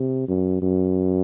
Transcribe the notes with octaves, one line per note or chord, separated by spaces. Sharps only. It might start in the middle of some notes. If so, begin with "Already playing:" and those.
Already playing: C3
F#2
F#2